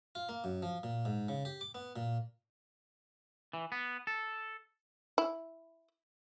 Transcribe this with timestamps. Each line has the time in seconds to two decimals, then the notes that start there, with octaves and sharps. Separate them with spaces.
0.15 F4
0.29 A#3
0.44 F#2
0.63 F3
0.83 A#2
1.05 G#2
1.29 C#3
1.45 G4
1.61 D6
1.75 B3
1.96 A#2
3.53 E3
3.72 B3
4.07 A4
5.18 E4